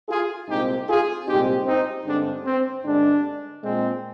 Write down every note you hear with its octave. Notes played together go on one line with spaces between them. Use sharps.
F4 G#4
C2 A#2 G#3 C4 D#4 G4
F4 G#4
C2 A#2 G#3 C4 D#4 G4
C4 D#4
G2 D3 G#3 C4 D4
C4
G2 D3 G#3 D4
A#2 G#3 C4